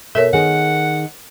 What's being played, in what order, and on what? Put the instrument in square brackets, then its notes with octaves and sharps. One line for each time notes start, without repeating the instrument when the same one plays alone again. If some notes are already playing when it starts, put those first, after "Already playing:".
[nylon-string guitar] B2 [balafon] A4 A#4 C#5 [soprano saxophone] E5
[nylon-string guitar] D#3 G#4 [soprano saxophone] F#5